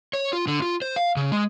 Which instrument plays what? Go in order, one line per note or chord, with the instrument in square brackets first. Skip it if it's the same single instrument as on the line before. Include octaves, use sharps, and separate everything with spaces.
[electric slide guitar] C#5
F4
D3
F4
C5
F5
C#3
G#3